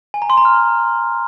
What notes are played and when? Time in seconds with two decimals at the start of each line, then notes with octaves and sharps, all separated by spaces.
0.14 G#5
0.22 A#5
0.30 C6
0.37 A#5
0.45 F6